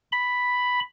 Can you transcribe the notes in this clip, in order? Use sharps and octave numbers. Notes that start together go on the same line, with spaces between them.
B5